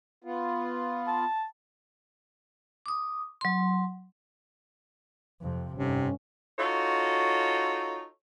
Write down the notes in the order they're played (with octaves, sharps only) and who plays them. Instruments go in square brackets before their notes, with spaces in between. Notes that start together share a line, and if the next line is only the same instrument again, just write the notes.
[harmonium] B3 F4
[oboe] A5
[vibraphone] D6 D#6
F#3 C6
[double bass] F2 C3
[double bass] G1 [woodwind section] F2 G#2 C3 [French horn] C#4
[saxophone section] D#4 F4 F#4 A4 C#5